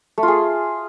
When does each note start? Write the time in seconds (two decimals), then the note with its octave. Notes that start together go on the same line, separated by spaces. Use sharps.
0.18 A3
0.23 F4
0.28 G#4